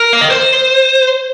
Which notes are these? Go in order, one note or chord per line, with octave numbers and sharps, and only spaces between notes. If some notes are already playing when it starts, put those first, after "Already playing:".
Already playing: A#4
F5
D#5
C5